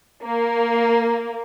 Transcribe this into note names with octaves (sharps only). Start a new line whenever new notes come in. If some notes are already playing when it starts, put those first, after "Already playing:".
A#3